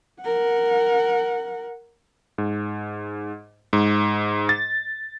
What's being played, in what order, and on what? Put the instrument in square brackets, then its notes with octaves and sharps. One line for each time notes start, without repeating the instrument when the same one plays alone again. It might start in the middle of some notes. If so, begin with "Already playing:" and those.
[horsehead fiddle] A#4 F#5
[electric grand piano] G#2
G#2
A6